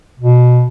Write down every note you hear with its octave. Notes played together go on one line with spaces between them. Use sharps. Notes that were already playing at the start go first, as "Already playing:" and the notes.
B2